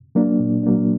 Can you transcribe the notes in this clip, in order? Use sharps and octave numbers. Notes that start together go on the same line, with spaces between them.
F#3 A#3 D4
A#2
F#3 A#3 D4